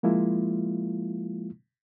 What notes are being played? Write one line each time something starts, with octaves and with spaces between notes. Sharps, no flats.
F3 G#3 A#3 E4 F4